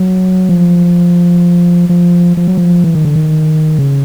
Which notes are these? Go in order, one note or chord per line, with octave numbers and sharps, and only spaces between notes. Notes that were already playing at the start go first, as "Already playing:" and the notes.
Already playing: F#3
F3
F3
F3
F#3
F3
E3
D#3
D3
D#3
C#3